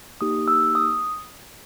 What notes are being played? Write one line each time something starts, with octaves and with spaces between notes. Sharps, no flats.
A#3 D#4 G4 D#6
E6
D#6